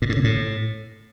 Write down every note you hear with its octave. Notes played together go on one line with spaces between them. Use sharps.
A#2
A2
C#3
A2